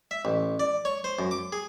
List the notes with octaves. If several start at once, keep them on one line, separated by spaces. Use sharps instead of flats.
E5
A1
D5
C#5
C5
F#2
D6
G#4